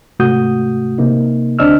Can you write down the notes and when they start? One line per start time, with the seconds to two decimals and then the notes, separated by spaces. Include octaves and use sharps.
0.20 G#2 C3 A3 F#4 D#6 G6
0.98 C3 A#3 D#4
1.59 D2 C4 D4 D#5 E6 F6